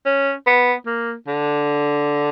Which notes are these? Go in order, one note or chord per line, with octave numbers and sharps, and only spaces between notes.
C#4
B3
A#3
D3